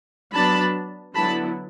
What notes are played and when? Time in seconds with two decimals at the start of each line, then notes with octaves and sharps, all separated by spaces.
0.33 F#3 B3 D4 A5 B5
1.15 D3 F#3 B3 E4 A5 B5